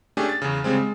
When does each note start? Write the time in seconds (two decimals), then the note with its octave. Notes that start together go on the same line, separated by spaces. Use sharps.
0.17 A3 C#4 D4 G4 G#4
0.29 A6
0.42 E2 C#3
0.64 C#3 G3 G#3 C4
0.77 G#3